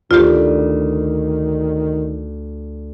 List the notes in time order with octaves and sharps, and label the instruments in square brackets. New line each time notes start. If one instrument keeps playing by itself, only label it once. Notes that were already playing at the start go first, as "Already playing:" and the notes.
[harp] D2 [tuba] D#3 [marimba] F4 G4